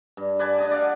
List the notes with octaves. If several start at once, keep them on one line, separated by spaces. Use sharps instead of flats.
G2
B4 D5 G#5 A5
D4 D#5 G#5
D5 F5 F#5